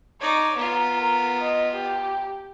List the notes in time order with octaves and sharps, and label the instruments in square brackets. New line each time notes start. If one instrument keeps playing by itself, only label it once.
[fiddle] D#4 D5 [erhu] C#5
[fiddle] B3 F4 [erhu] A#5
[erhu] A#4
D#5
G4